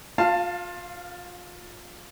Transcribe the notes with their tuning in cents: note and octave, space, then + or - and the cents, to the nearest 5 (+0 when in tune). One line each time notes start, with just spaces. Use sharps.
F4 +25 F5 -10 A5 +15